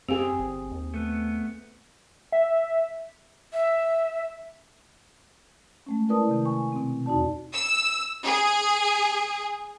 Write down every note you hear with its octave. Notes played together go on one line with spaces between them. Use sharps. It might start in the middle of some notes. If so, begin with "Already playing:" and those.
F#2 C4 G4 G#4 F5 G#5
G1
D#2
A3 B3
E5
E5
G#3 A3 C#4
E4 A#4 B4 D5 A5 D#6
C3 D#3
G#5 C#6
B2 C4
E2 D#4 F#4 D5 A5
E6
G#4